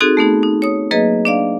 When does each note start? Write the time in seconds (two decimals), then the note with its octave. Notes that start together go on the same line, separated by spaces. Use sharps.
0.01 C4 D#4 F#4 G#4 A4
0.17 A3 B3 D#4 G#4
0.43 D#4
0.62 C#5 D#6
0.91 F#3 A#3 G#4 B4 D#5
1.25 D4 D5 F5